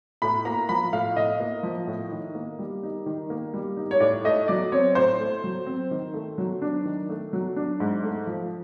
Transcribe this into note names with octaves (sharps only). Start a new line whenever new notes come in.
A2 B5
A#3 A#5
F3 B5
A2 F5
A2 D#5
A#3
F3
A2
D#3
A#3
G3
D#4
D#3
A#3
G3
D#4
C#5
A2 D5
A3 D#5
F#3 D5
C4 C#5
A2 C5
A3
F#3
C4
D#3
A3
F#3
D4
D#3
A3
F#3
D4
G#2
A3
F3